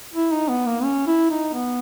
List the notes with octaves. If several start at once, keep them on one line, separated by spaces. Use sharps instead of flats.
E4
D#4
B3
A#3
C#4
E4
D#4
B3